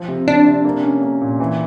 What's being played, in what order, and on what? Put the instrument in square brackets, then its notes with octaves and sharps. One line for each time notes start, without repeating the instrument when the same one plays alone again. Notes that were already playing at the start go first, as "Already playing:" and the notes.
Already playing: [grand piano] F3
C3
[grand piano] C3 [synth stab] D4
[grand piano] C3
A#3
C#4
A#3
A#2
E3